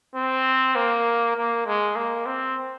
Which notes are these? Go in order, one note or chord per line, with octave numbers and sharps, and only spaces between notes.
C4
A#3
A#3
G#3
A#3
C4